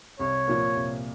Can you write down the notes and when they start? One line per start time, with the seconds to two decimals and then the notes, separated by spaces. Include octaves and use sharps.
0.20 C2 C#5
0.48 A#2 F3 A#3
0.75 C2